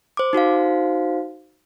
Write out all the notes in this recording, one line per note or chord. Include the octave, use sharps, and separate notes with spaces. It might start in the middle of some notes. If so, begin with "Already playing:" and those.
C5 D6
D#4 F#4 C5 F5